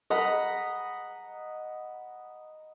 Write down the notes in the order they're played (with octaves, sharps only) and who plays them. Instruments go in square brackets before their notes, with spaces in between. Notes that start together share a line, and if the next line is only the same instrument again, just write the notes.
[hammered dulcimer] D#5 F#5 A#5 B5